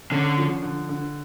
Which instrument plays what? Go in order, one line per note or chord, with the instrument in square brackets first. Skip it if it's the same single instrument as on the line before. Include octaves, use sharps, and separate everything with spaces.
[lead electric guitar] D3 [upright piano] C#4
[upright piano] F3
D3
D3